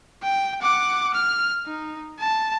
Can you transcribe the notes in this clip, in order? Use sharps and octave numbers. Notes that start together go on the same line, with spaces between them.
G5
F#5 D6
F6
D#4
A5